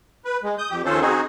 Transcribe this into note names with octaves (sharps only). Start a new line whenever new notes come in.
B4
G#3
D#6 G6
F2 G4
D#2 F3 C#4 A4 C5
C4 D#4 F#4 G#4